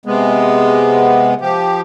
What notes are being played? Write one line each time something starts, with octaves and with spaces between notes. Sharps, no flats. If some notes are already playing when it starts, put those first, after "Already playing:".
C3 G#3 B3
F3 G4